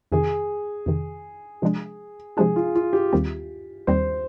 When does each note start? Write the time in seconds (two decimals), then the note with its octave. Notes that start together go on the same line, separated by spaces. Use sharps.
0.12 F2 C3 D#3 G#4
0.86 F2 C3 D#3
1.62 C3 F3 G#3 D4
2.37 C3 F3 G#3 D4 G#4
2.56 F4
2.75 F4
2.93 G4
3.13 D#2 D#3 G3 C4
3.87 D#2 D#3 G3 C4 C5